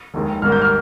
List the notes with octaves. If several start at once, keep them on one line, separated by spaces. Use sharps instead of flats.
F1 D#2 D#3 G#3
G#1 G#2 G3 A#3 F6
G6
F6